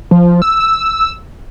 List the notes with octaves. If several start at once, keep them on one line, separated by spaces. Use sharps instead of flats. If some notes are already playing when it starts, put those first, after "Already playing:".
F3
E6